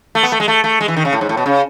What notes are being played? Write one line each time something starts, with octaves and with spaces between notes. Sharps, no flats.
A3
B3
A3
G#3
A3
A3
G#3
E3
D#3
C#3
A2
G#2
A2
B2
C#3